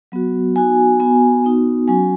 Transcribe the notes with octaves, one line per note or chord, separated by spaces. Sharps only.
F#3 B3 F#4
B3 D#4 F#4 G#5
B3 F#4 G#5
B3 D#4 F#4
F#3 C#4 F#4 G#5